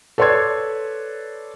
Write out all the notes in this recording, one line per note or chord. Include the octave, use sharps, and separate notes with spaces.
A4 B4 C#5 D5 C6 G#6